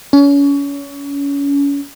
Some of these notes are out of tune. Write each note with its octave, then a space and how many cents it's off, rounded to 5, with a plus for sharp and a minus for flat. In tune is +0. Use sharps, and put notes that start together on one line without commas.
C#4 +30